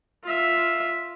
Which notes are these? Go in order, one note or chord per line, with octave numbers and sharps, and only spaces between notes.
F4 E5